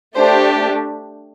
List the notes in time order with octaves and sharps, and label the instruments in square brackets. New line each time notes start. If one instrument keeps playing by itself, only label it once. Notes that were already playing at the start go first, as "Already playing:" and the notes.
[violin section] A3 D4 G4 C5